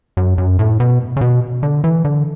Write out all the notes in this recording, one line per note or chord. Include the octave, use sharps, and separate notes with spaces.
F#2
F#2
A2
B2
C#3
B2
D3
E3
D3